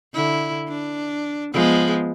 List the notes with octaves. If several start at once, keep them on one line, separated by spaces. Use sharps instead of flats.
D3 E4
D4
F3 G#3 B3